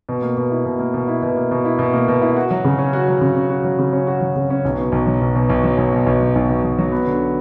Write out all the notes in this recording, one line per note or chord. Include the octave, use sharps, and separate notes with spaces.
B2
A#3
B2
E4
B2
A#3
B2
E4
B2
A#3
B2
E4
B2
A#3
B2
E4
F#4
F#3
C#3
C#4
F#4
F#3
C#3
C#4
F#4
F#3
C#3
C#4
F#4
F#3
C#3
C#4
B1
B2
B1
F#3
B1
B2
B1
F#3
B1
B2
B1
F#3
B1
B2
B1
F#3
B3
D3